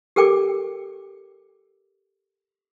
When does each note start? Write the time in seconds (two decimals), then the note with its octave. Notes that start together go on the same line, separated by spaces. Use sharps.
0.16 G4 A4 A#4 G5 D6